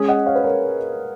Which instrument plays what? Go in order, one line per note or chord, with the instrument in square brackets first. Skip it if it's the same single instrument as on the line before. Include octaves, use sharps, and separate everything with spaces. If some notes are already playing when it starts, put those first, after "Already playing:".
Already playing: [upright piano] G#3 C#4 G#4
[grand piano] D#5 F#5
C#5 F5
B4
A#4 C#5